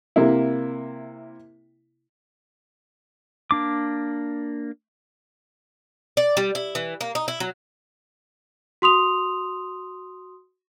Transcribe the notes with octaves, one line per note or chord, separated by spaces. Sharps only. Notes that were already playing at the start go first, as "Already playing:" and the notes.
C3 A#3 E4
A#3 D4 D6
D5
G3
E4
E3
A#3
D#4
E4
F#3
F#4 C6 D#6 F7